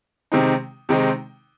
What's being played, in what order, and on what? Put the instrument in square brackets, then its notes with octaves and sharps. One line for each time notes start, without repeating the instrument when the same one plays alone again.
[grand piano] C3 D#3 G#3 C4 D#4
C3 D#3 G#3 C4 D#4